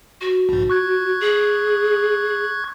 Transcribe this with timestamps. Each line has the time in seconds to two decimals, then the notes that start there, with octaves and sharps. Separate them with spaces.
0.21 F#4
0.49 A#1 G#2
0.70 C#6 F#6 G#6
1.20 G#4